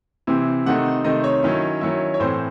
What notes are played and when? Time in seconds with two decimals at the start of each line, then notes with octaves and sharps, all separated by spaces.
0.27 C3 E3 C4 E4
0.66 C3 D#3 A3 C4 D#4 F#5
1.04 C3 D#3 A3 C4 D#4 D#5
1.24 C#5
1.43 D#3 F#3 C#4 E4
1.81 D#3 F#3 C#4 E4
2.14 C#5
2.20 A2 E3 C4 C5